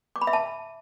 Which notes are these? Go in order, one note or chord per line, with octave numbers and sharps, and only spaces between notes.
D6
B5
E5
A5